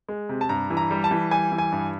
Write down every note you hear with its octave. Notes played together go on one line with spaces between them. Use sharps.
G#3
C3
A5
G2 A#5
E3
A#5
G3
A5
E3
G3 G#5
E3
G#5
G2